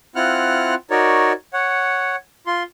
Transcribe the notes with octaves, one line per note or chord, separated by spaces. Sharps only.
C4 E4 F4 F#5 F6 F#6
D#4 F#4 A#4 C#5 D5
C#5 F#5
F4 C6